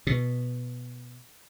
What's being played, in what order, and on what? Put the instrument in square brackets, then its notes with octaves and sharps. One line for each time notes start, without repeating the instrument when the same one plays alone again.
[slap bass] B2